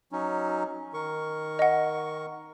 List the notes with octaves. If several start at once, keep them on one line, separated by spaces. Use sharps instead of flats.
F#3 C#4 D#4
D#3 A#4 C#6
D#5 F#5